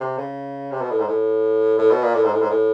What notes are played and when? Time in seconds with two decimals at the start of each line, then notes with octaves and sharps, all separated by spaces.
0.01 C3
0.18 C#3
0.72 C3
0.81 B2
0.91 A2
0.99 G#2
1.08 A2
1.79 A2
1.91 B2
2.03 A#2
2.15 A2
2.24 G#2
2.33 A2
2.42 G#2
2.50 A2